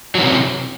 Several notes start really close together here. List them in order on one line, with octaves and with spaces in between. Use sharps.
F#3 E3 C#4 C3